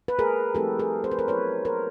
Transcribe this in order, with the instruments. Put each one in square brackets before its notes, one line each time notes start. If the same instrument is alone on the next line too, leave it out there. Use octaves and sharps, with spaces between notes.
[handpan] B4
G#4 A#4
F3 A3 C4 E4 G4 A4
G#4 A#4
C5
B4
A#4 C5
F#3 B3 E4 B4 C#5
A#4 C5